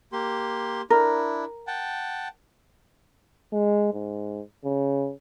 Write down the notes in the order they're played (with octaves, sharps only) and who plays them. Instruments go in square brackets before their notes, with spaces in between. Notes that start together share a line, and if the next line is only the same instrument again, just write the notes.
[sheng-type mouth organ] A#3 G4 C6
[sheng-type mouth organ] D4 E4 [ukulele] A#4
[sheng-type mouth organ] F#5 G5 A5
[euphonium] G#3
G#2
C#3